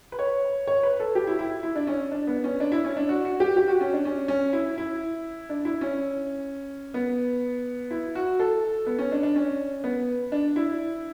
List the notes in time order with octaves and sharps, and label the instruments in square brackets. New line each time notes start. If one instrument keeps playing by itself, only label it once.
[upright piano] B4
C#5
C#5
B4
A4
G4
E4
E4
E4
D4
C#4
D4
B3
C#4
D4
E4
C#4
D4
F#4
F#4
G4
G4
F#4
C#4
D4
C#4
C#4
E4
E4
D4
E4
C#4
B3
E4
F#4
A4
B3
C#4
D4
D4
C#4
B3
D4
E4